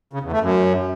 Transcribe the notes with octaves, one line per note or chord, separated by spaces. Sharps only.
C#3
E2
A3
F#2